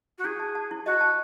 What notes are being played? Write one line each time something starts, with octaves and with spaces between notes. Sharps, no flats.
F#4
E4 G#4
A5
A5
E4
F#4 D#5
A5